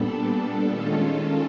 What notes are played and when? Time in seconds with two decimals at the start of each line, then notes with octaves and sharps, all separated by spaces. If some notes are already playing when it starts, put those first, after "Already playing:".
Already playing: A#2 G3 B3 D4 A4
0.70 D#3 G#3 C#4 F4 A4